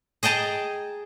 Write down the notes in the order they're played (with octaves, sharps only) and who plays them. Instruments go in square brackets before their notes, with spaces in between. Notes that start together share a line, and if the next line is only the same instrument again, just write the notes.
[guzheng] G#4 D#5 G5 A5 A#5